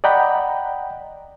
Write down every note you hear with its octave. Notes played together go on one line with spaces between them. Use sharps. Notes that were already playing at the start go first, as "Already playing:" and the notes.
D5 D#5 F#5 G5 A#5 B5